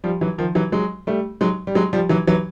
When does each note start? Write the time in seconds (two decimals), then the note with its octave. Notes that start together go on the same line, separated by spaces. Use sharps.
0.04 F3 G3
0.21 E3 F#3
0.38 D#3 F3
0.55 E3 F#3
0.72 F#3 G#3
1.07 G3 A3
1.41 F#3 G#3
1.67 G3
1.75 F#3 G#3
1.93 F3 G3
2.09 E3 F#3
2.27 E3 F#3